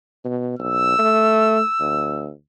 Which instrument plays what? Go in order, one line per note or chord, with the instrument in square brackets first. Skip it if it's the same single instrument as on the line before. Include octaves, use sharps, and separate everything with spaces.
[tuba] B2
[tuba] B1 [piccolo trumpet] E6
[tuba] A3
D2